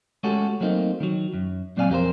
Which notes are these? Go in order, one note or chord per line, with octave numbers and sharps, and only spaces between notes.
G#3 A3 C#4 F#4 G4 A4
F#3 A3 A#3 C4 D#4
D#3 F#3
F#2
A#2 F#3 C4 D5 F5 G#5
F2 G4 A#4 C5